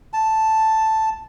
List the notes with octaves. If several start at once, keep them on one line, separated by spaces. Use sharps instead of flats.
A5